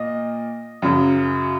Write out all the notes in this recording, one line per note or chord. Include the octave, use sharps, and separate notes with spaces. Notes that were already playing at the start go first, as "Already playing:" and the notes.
Already playing: A#2 A#3 D#5
F#2 C#3 F#3